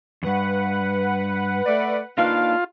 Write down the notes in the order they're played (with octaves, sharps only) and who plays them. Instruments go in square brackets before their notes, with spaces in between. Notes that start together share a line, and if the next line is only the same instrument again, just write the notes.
[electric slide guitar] E2 G2 [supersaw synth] B4 F#5
[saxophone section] A3 D5
[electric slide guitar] A#3 D4 D#4 [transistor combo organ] F4 [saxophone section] B4 F5